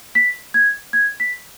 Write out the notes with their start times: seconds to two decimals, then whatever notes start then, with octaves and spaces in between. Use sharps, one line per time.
0.15 B6
0.54 G#6
0.93 G#6
1.20 B6